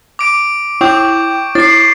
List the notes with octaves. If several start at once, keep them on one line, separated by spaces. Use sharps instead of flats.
D6 D7
E4 G5 C#6 G6
E4 A6 C7